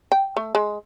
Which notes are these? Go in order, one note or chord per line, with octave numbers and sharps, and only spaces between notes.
G5
A3
G#3